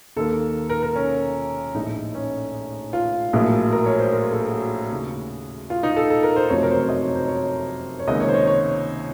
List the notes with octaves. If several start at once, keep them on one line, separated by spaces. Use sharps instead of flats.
D#2 D#3 A#3 A4
A#4
A#4
C#4
A#1 A2 A3 D#4
C#4
F4
A#1 A2 F#3 A#3
A#4
C#5
C5
A#4
A4
F#4
D#2 C#3 A3
F4
D#4
A4
A4
A#4
C5
F#1 F2 C3 F#3 A3 C#5
A#4
C5
C#5
D#5
C#5
C5
C#5
C#5
C#2 C3 D#3 A#3 D#5
C#5
C5
C#5
C#5